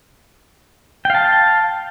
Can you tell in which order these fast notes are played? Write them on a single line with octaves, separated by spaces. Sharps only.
G5 F5 A5